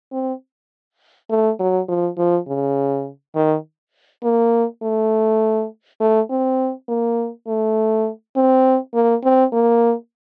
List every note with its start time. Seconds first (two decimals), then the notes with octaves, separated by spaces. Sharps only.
0.12 C4
1.30 A3
1.59 F#3
1.88 F3
2.17 F3
2.48 C#3
3.35 D#3
4.23 A#3
4.83 A3
6.00 A3
6.30 C4
6.88 A#3
7.47 A3
8.36 C4
8.94 A#3
9.24 C4
9.53 A#3